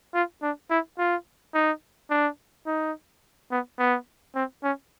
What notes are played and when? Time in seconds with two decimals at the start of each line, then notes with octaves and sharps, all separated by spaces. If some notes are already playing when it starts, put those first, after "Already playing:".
0.14 F4
0.42 D4
0.70 E4
0.99 F4
1.54 D#4
2.10 D4
2.66 D#4
3.51 B3
3.79 B3
4.35 C4
4.63 C#4